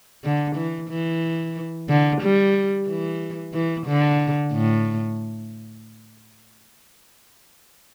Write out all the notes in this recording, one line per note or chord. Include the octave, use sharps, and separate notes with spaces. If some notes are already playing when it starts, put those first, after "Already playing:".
D3
E3
E3
D3
G3
E3
E3
D3
A2